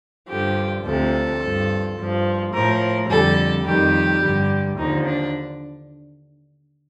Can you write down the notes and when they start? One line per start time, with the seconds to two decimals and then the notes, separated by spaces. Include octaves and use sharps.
0.29 G2 D3 F3 G4
0.85 D2 C3 F3 A4
1.41 G2 F3
1.97 G2 F3
2.53 A2 F3 A#4
3.09 F2 D3 G3 A4
3.66 F2 D#3 G3 G4
4.22 G2 D3 G3
4.78 D#2 D3 F3 D#4
5.06 D4